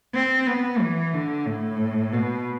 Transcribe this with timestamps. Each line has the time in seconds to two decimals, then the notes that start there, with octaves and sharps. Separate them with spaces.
0.15 C4
0.47 B3
0.81 E3
1.14 D3
1.47 A2
2.13 B2